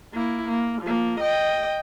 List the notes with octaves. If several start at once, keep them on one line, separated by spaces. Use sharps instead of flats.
A#3 E4
A#3
F3 A#3
D#5 G5